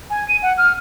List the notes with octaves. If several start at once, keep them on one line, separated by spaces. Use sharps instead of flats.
G#5
D#7
F#5
F6